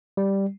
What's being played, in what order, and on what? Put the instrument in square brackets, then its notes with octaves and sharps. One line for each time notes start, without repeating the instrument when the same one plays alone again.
[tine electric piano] G3